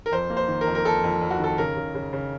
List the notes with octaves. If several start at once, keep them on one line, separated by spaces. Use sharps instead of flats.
A#4
F2 C5
A#3
C5
D#3
A#4
F2
A#4
F2 A4
F2
F2
F#4
D#3 A4
C#3 A#4
C#3
C#3
C#3